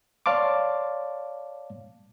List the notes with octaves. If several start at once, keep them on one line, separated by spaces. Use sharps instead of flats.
C#5 D5 F5 A5 C6 D6